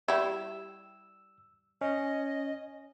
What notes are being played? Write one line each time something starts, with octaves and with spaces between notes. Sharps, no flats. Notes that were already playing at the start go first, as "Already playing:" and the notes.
G3 E4 E6
C#4 D#5